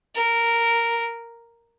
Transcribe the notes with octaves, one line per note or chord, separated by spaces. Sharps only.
A#4